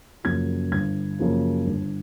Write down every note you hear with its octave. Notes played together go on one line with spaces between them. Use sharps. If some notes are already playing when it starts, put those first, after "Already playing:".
F#2 C#3 F3 A#3 G#6
G1 G#6
F#2 C#3 F3 A#3
G1